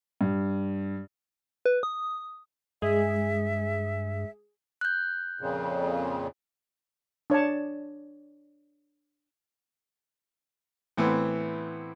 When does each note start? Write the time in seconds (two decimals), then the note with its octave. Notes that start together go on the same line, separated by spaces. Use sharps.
0.21 G2
1.65 B4
1.83 D#6
2.82 G2 G#3 G#4 E5
4.81 F#6 G6
5.41 F2 A#2 C#3
7.30 D4 C#5 D5 A5
10.97 A2 E3 B3 C4